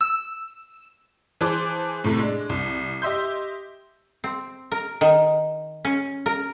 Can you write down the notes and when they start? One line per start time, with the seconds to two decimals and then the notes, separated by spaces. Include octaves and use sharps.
0.01 E6
1.41 E3 G#4 C5 A5 C6 D6
2.04 A2 C3 A3
2.19 G#3 D4
2.49 C2
3.02 G4 D#5 E5 C6 G6
4.24 C4
4.72 A#4
5.01 D#3
5.85 C#4
6.26 A#4